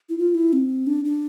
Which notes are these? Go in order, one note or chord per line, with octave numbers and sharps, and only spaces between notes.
E4
F4
E4
C4
D4
D4